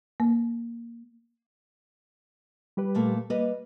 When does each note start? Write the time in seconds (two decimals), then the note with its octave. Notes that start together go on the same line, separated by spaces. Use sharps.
0.20 A#3
2.77 G3 G4 B4
2.95 A#2 A3 A#3
3.30 G3 A#3 B4 D#5